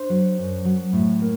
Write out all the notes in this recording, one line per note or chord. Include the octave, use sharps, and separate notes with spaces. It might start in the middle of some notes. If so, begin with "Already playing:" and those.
Already playing: D4 C5
F#3
F#2
F#3
A2
A#3